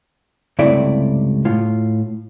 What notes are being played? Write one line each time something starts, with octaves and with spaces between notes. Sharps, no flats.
C#2 G2 C3 A3 E4 D5
A2 F4